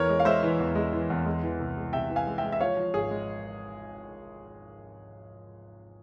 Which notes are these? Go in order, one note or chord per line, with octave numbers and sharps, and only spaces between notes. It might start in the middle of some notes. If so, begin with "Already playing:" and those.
Already playing: E2 E3 A#4 C#5
G#3
F5
G#3 C5 E5
E3
E2
G#3
E3
E2
G#3
E3
C2
G#3
C3 E5 G5
E3
F5 G#5
G#3
E5 G5
G#3
E5
F3 C#5 F5
F3
G#1 G#4
G#3